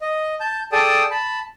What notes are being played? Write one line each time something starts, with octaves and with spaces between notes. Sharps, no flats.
D#5
A5 G6
G#4 A4 D5 G5 A5 D#6
A5 B5